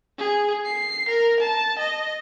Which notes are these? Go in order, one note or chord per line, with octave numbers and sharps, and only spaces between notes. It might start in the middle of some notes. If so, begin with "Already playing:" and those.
G#4
C7
A#4
A5
D#5